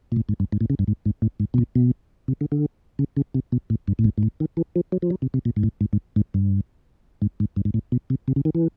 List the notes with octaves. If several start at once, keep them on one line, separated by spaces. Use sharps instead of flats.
A#2
A2
G#2
G2
G#2
A2
C#3
G2
G#2
G#2
A2
G#2
B2
A#2
B2
C3
D3
D3
C#3
C#3
C3
B2
A2
G2
A2
G#2
G#2
A2
D#3
E3
F3
F#3
F3
F#3
C3
C3
A#2
G#2
A2
G#2
G#2
G#2
G2
G#2
G#2
G2
G#2
A2
B2
C3
C3
C#3
D#3
E3